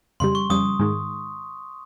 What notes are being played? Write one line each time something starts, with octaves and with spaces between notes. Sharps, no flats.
F2 C#3 G3 C6
C#6
F2 C#3 G3 D#6
G#2 D#3 G#3